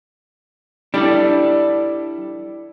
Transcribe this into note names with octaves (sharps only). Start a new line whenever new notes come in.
G3 D4 E4 A4 D5